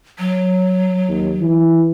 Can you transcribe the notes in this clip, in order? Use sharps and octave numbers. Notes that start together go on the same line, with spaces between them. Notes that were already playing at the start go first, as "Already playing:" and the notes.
F#3
D#2
E3